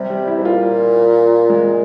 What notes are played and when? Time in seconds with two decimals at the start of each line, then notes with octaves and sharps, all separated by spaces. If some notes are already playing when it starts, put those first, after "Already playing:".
Already playing: C3 G3
0.10 G3
0.27 E4
0.38 G#2
0.45 A#2 F4
1.50 G#3